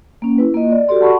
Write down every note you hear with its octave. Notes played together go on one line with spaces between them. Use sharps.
A#3 C#4
E4 B4
A#3 F4 D#5
D5
F#4 G4 A4 D5 C6
F#5 A5 B5 C#6